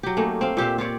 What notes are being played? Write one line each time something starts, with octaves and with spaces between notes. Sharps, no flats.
F#3 G4
A3 A#3 C#4 D#4
C4 F5
A#2 G4 E5 F5
F4 G4 C#5 D5